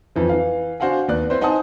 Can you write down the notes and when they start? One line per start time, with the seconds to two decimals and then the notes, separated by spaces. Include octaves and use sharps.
0.16 F2 E3 F3
0.29 E3 F5
0.80 D4 F#4 C5 F5 F#5 G#5
1.08 D#2 B3 D5 F#6
1.30 C4 E4 B4 C5
1.41 D#4 C5 F#5 G#5 A5 D#6